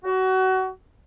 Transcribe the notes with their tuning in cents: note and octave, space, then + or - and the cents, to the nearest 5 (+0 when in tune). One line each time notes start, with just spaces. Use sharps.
F#4 +25